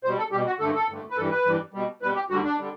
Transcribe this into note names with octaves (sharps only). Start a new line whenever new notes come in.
B2 G3 C5
A4
B2 G3 G4
F#4
G2 D3 A3 A4
A4
G2 D3 A3
B4
G2 E3 G3 A4
B4
G2 E3 G3
B2 G3
B2 G3 B4
G4
D2 D3 G3 F#4
D4
D3 G3